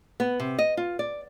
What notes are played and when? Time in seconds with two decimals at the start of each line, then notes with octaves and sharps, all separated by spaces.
0.20 B3
0.40 C3
0.59 D#5
0.77 F4
0.99 D5